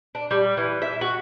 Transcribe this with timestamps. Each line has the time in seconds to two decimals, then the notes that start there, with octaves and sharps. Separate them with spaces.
0.15 D4
0.31 G3
0.57 E3
0.82 E5
1.01 F#4